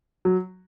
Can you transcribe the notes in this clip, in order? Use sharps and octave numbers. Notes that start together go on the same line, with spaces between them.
F#3